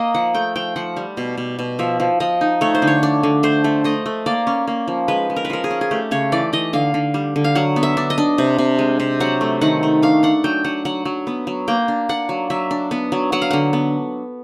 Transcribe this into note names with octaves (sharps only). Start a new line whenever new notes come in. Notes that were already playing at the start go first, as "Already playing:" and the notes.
Already playing: A#3 D#5
F3 F#5
A3 G5
F3 G5
F3 F#5
G3
B2
B2
B2
F3 E5
F3
F3 D#5
D#4
A3 C#5
C5
D3
C#5
D4
D3
A3 C5
A3
A3 D#5
A3
A#3 D5
C#4
A#3
F3
G#3 B4
G#3
A#4
B4
F3 A#4
G#4
C#4
G#4
A3 G4
C#3 C#5
E3 D5
E3 D#5
D3 F5
D3
G3
D3
F5
F#3 F#5
B3
E5
D4
D#5
D4
C3
C3
G#3
C3
F#3 F#5
A3
D#3 F#5
A3
D4 F5
D4 F#5
F#3 G5
F#3 F#5
F#3 F#5
F#3
B3
F#3
A#3 G5
D4
D4 F#5
F#3
F#3 E5
D4
B3
F#3
F#3 F#5
F5
D3 F#5
B3